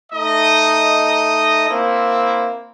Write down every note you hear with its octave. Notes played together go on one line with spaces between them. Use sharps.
A3 D#4 D#5
A#3 C4 E4